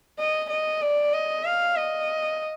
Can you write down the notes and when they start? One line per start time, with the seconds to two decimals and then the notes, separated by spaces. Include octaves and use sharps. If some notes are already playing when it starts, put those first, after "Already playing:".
0.19 D#5
0.50 D#5
0.82 D5
1.13 D#5
1.45 F5
1.76 D#5